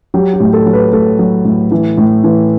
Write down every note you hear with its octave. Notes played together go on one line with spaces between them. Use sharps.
F#3 G4
G4
A2
A4
F#3
B4
A2 A4
F#3
A2
E3
A2
E3